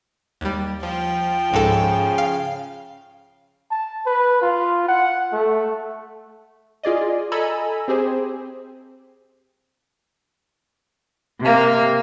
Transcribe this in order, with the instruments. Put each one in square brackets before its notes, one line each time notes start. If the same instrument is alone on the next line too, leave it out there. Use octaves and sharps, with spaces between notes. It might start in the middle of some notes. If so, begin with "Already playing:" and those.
[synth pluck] D#2 G3
[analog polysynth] F3 [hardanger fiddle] G5
[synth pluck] C#2 G#2 A4 [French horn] C#3
[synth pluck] F5
[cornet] A5
B4
F4
F#5
A3
[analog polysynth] F4 G#4 D5 D#5
A4 D#5 G#5 A#5 B5 E6
C4 G4 G#4 C5
[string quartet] C3 A#3